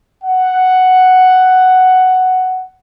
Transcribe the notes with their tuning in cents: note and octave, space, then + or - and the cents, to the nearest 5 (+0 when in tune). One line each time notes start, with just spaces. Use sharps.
F#5 +5